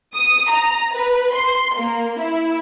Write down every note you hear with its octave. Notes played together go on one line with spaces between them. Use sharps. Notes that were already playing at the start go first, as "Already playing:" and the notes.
D#6
A#5
B4
C6
A#3
E4